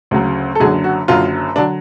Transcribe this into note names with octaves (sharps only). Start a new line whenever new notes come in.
D2 C#3 F#3
A4
F#1 F#2 D3 F#3 G#4
F#4
F#1 F#2 D3 F#3 F4
D3 F#3 D4